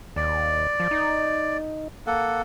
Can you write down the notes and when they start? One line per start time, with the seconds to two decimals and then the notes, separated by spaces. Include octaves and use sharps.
0.16 D#2 D5
0.80 F3
0.91 D#4
2.07 A#3 A4 F#5